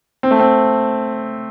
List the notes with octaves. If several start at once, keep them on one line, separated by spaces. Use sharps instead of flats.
C4
A3
C4